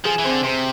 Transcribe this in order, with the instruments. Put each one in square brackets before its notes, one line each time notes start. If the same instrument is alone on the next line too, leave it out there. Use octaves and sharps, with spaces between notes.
[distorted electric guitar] F3 [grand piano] G#4
[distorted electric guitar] E3
[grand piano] C4
[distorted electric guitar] D3
[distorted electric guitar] C3 [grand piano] C4